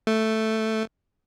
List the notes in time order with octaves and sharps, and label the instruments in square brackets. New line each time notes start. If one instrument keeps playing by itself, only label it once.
[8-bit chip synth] A3